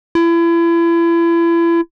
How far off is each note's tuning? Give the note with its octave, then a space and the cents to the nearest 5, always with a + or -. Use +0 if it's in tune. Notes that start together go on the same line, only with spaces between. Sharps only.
E4 +35